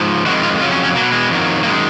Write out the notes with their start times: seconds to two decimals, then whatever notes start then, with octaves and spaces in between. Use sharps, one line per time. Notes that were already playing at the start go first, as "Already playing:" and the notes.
Already playing: G#2 F3
0.26 F2 D#3 G#3 F#4
0.43 F4
0.60 F2 C#3 F#3 F4
0.72 C#4
0.83 C#4
0.95 B2 F#3 A#3
1.12 G#3
1.29 F2 D#3 F#3
1.63 F#2 D#3 G#3 A#3